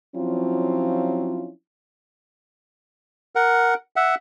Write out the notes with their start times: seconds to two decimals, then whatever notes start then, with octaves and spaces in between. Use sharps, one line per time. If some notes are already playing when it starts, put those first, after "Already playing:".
0.16 F3 F#3 C4 C#4 E4 F4
3.35 A#4 F#5
3.96 E5 F#5